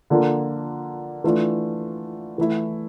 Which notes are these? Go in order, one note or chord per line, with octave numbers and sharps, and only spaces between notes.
D3 F3 A#3 D4 F4
E3 A3 D4 F4
E3 A3 E4